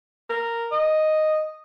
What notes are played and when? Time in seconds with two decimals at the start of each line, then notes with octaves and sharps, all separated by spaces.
0.30 A#4
0.72 D#5